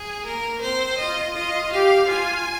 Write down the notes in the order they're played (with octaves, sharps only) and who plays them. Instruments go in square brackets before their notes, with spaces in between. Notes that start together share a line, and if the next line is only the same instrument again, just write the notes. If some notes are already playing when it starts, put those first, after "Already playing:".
Already playing: [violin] G#4
[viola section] A#3 [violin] A#4
[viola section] C4 [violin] C5
[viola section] F4 [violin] D#5
[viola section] F4 [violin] D#5
[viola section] G4 [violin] F5
[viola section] F4 [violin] G#5